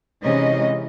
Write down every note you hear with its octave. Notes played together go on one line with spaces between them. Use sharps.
C3 E3 G#3 C#4 D#4 D#5